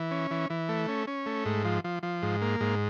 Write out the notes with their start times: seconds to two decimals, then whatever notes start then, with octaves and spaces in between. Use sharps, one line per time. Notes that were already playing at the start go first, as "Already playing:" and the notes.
Already playing: E3
0.11 C#4
0.31 E3
0.50 E3
0.69 A3
0.88 C#4
1.07 C#4
1.26 A3
1.45 G#2
1.65 F3
1.84 F3
2.03 F3
2.22 G#2
2.42 A#3
2.61 G#2